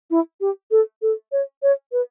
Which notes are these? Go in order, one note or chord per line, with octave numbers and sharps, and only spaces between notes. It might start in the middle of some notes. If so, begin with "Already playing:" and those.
E4
G4
A4
A4
C#5
C#5
B4